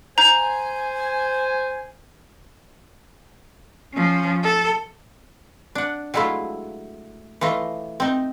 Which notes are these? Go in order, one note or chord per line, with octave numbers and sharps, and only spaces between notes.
C5 G#5 A#5 G6
F3 C#4
A4
D4 F#5
F#3 G#3 A3 E4 F4
E3 A3 F4 D#5
C4 D#4